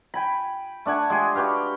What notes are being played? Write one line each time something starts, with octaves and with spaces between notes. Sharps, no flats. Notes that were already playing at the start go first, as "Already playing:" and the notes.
G5 G#5 B5
A3 D4 F#5 G#5
G#3 G4 G#4
F#4 G4 B4 F5